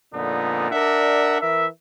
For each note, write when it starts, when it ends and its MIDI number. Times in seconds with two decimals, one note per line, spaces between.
0.14 0.71 41
0.14 0.71 46
0.14 0.71 50
0.14 0.71 59
0.14 0.71 63
0.71 1.39 62
0.71 1.39 70
0.71 1.39 74
0.71 1.39 76
0.71 1.39 78
1.41 1.67 52
1.41 1.67 70
1.41 1.67 76